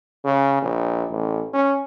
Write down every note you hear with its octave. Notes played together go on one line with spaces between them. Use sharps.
C#3
A#1
A1
C#4